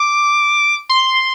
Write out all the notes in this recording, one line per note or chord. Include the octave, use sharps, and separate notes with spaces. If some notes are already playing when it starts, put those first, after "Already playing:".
Already playing: D6
C6